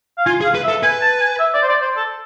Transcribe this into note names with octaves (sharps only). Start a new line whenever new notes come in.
F5
F4 G#5
G#4
F5
B4
E5
A4
B4 G#5
A5
G#5
E5
D5
C5
D5
C5
A4